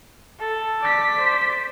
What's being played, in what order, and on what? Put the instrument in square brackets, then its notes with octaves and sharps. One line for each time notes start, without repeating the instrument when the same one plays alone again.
[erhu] A4
[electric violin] D5 B6
[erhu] C5